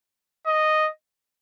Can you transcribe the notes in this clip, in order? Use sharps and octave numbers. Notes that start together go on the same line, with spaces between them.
D#5